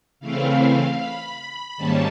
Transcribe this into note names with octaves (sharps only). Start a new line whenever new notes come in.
C#3 E3 A3 C4 E4 F5
B5
G#2 D#3 G3 A#3 C#4 A5